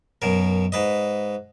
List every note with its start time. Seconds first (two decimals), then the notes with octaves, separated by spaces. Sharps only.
0.22 F#2 B2 A#4
0.72 G#2 B4 D#5